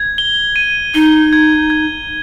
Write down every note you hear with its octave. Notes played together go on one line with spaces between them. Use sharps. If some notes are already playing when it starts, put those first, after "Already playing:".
Already playing: G#6
G7
D#7
D#4 G7
G#6
G#6